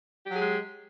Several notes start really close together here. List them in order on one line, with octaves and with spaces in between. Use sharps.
G4 F#3 G#4 G#3